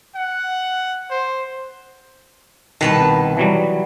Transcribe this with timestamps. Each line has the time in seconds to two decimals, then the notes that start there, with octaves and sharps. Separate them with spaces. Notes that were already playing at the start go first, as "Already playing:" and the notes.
0.14 F#5
1.10 C5
2.81 C2 B2 D#3 B4 A5
3.37 E3 F#3 G3